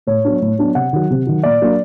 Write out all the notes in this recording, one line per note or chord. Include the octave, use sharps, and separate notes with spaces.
A2 C#5
F#3 B3 D4
A2
F#3 B3 D4
C3 F#5
D#3 F#3
C3
D#3 F#3
A#2 D5
F#3 A#3 D4